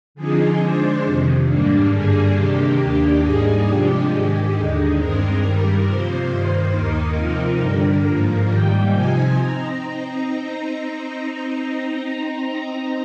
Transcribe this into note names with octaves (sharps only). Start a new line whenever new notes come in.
D3 F3 C4 D#4 G#4
D3 G#3 D4 C5
F2 C3 D#3
G#2 G3 A#3 D4
G2 D3 G3 A#3 D4 G#4
C3 D#3 A#3 D4 G4
D#2 D#3 A#3 D4
G#2 G3 A#3 D#4 G#4
C3 F3 G#3 D4 G4
G#2 D#3 G#3
D#2 D3 G#3 D#4
G2 D#3 G#3 C4 A#4
G2 D#3 G3
C3 F3 A#3 C5
G2 D#3 A#3
D#2 D#3 A#3 D#4 A#4
C3 F3 C4 D#4
G2 D3 G3
G#2 F3 A#3
G#2 D#3 G3 A#3 G5
C3 F3 C4 D#4 G#5
C4 D#4 A#5